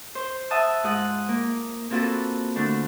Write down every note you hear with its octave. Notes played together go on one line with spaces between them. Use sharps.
C5
E5 F#5 A5 D#6 E6
G#2 F4 D#6 F#6
A#3
A#3 C4 F4 F#4 A4 B4
D3 A3 D4